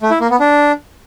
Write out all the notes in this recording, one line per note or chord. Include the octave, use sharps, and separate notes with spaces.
A3
E4
A#3
B3
D4